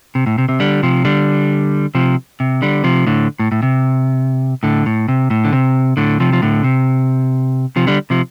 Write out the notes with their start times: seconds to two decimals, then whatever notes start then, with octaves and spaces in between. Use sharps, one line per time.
0.15 C3
0.26 A2
0.38 C3
0.49 C3
0.60 D3 G3
0.83 C3 F3
1.05 D3 G3
1.95 C3 F3
2.40 C3
2.62 D3 G3
2.84 C3 F3
3.07 A2 D3
3.40 A2
3.52 A2
3.63 C3
4.63 A2 D3
4.86 A2
5.08 C3
5.30 A2
5.45 D3
5.53 C3
5.97 A2 D3
6.20 C3 F3
6.33 F3
6.42 A2 D3
6.64 C3
7.76 C3 F3
7.87 D3 G3
8.10 C3 F3